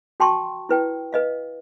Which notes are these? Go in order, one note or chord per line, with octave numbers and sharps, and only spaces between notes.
F#4 G5 A5 C6 C#6
E4 B4 G5
B4 D#5 F5